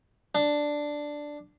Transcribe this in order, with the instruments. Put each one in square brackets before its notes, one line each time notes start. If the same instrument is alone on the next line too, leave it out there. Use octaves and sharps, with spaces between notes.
[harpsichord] D4